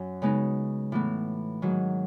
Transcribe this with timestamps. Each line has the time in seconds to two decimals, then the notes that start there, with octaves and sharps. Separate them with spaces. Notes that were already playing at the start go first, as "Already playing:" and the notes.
Already playing: F#2
0.22 C#3 G#3 B3 D#4
0.92 A2 E3 B3
1.62 G#2 D#3 F#3